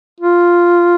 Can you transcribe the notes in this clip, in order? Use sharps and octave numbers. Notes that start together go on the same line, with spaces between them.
F4